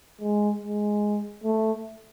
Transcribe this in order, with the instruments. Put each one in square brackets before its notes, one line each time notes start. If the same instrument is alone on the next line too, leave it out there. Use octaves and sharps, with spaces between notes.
[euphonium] G#3
G#3
A3